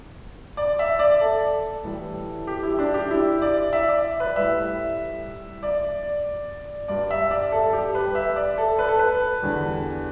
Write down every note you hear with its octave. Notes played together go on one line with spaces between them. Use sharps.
D5
E5
D5
A4
A2 E3 G3
G4
E4
D4
G4
E4
D5
E5
D5
B4
A2 G3 E5
D5
G2 G3 D5
E5
D5
A4
G4
B4
E5
D5
A4
B4
A4
B4
E2 D3 G3